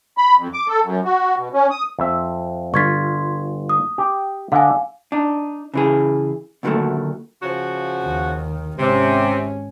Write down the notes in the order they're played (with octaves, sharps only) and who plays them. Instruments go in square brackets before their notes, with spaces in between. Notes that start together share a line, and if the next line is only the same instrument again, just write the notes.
[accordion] B5
F2
D6
A4
F#2
F#4
B2
C#4
D#6
[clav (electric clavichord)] F2 E5
[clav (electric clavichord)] G1 F4 [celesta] C#6 G#6 B6
[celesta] D#6
[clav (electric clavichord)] G4
[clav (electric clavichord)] D3 D#5 [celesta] F5 G#5
[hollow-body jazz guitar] D4 D#4
C#3 E3 G#4
D2 A#2 D#3 F3 F#3 A3
[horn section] C#3 F3 F#4
[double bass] D#2 D#3
[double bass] G#1 C#4 [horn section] C3